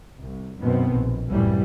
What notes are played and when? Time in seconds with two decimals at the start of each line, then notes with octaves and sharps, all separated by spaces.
0.21 C2
0.59 F#2 B2 D#3 B3 C4
0.93 A#1
1.29 C2 F#2 A2 E3 G3